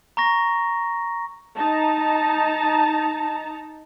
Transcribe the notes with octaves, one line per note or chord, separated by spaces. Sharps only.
A#5 C#6 A#6
D#4 A5 A#5